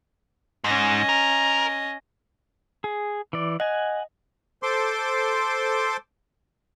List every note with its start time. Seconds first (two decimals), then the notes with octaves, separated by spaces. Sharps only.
0.64 G#2 C#4 D#5
1.09 A#4
2.84 G#4
3.33 E3 D5
3.60 D#5 F#5 G#5
4.63 A4 C5 C6 D6